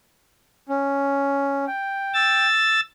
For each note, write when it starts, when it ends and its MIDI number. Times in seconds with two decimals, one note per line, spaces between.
0.69 1.65 61
1.67 2.47 79
2.14 2.80 88
2.14 2.80 93